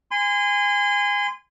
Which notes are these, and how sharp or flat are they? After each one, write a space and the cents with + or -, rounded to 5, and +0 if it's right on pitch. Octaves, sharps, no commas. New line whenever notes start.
G#5 -25 C6 -30